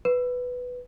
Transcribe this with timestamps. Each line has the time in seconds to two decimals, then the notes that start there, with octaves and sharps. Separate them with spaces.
0.05 B4